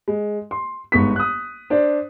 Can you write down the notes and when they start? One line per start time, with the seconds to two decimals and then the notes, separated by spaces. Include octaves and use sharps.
0.08 G#3
0.51 C6
0.92 G1 G#2 B3 C#6 B6
1.16 D#6 F#6
1.70 D4 C5 D5